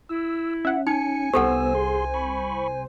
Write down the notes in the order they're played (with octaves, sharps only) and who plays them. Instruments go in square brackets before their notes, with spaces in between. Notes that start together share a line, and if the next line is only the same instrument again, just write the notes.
[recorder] E4 [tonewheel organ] E6
[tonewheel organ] C#4 [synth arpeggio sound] E5 F#5
[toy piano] D#4 [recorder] G#5 [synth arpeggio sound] C#7
[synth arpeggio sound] C2 C5 [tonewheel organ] B3 E6 [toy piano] G4 A4 F#5
[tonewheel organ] G#4 C6
B5 C#6